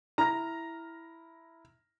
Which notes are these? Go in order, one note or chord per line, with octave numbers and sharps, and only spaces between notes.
E4 A#5 F6 A#6